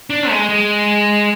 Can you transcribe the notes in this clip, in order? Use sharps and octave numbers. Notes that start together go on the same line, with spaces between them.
D4
G#3
G#3